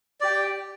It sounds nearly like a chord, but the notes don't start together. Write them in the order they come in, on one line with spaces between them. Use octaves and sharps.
D5 G4 G5